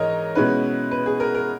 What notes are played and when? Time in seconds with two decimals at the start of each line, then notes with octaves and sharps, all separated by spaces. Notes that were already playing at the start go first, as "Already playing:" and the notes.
Already playing: G#2 E3 A#4 C#5 D#5
0.35 B2 G#3 C#4 E4 B4
0.91 B4
1.06 G#4
1.20 A#4
1.35 A#4